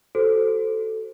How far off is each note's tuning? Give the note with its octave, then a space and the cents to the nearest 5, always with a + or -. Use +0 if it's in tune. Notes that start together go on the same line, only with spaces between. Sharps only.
F#4 +25 A4 +0 C5 +0